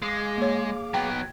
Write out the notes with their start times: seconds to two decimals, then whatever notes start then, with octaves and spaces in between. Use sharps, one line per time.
0.02 G#3 G#4 F5 D6
0.38 A#3 C#5
0.94 F#3 B3 G5